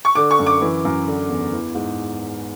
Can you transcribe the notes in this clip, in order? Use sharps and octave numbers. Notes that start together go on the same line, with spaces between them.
C#6
D3 D6
C#6
F#2
D6
E3
F#2
D3
E2
E3
G#2